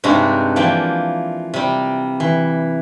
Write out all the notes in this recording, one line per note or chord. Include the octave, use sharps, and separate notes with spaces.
G2 C3 G#3 D4 D#4 F#4
E3 F3 A#3 D5 G5
C3 G3
E3